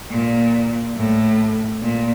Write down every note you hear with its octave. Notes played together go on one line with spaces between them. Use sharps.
A#2
A2
A#2